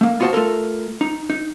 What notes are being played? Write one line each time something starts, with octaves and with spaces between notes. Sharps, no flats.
A3 A#3
B3 F4 F#4 G#4 C5 A5
A3 F4 A4 A#4
D#4
D#4